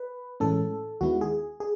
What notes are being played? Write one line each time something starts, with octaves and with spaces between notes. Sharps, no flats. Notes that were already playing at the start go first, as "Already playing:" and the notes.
Already playing: B4
A2 E3 G#3 C#4 A4
D#2 D#3 G#3 B3 E4 F#4
G#4
G#4